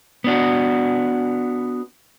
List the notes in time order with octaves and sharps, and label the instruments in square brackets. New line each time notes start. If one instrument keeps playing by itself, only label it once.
[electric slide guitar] B3 D4 F#4